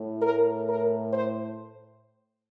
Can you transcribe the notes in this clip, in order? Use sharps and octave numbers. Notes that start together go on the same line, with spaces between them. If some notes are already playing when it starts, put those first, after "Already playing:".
Already playing: A2
A#4
A#4
C5